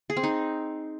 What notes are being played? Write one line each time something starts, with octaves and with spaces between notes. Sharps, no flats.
G#4
C4
D#4